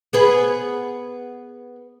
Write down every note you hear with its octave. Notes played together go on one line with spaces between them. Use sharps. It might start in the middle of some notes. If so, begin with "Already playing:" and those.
B3 G#4 B4